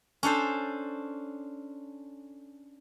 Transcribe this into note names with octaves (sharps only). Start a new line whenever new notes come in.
C#4 D4 A4 C5